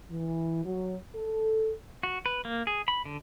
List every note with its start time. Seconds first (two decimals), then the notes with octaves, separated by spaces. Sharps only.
0.11 E3
0.65 F#3
1.15 A4
2.03 F#4
2.26 B4
2.45 A#3
2.67 G#4
2.88 B5
3.05 D3